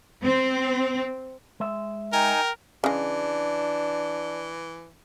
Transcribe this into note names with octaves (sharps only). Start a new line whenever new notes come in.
C4
G#3 E5
D#4 A#4 G5 G#5
C#3 E3 G#3 D4